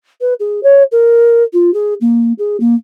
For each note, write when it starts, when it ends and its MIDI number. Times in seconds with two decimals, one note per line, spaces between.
0.21 0.34 71
0.40 0.63 68
0.63 0.83 73
0.92 1.43 70
1.53 1.73 65
1.74 1.94 68
2.01 2.33 58
2.39 2.57 68
2.60 2.75 58